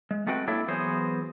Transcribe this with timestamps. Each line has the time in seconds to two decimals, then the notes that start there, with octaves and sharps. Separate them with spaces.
0.11 G#3
0.27 G#3 A3 C4 F#4 B4 G5
0.48 A#3 D4 E4 A4 C#5 E5
0.68 E3 F#3 B3 G#4 C5 C#5